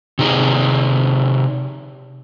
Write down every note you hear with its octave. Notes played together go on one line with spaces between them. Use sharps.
C3 D#4 G#4